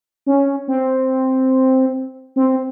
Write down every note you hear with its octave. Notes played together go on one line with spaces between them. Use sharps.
C#4
C4
C4